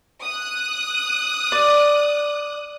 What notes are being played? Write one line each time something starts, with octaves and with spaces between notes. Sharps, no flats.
D#6 F#6
D5